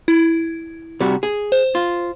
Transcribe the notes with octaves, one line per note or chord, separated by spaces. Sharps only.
E4
C3 G3 F#4
G#4
C5
F4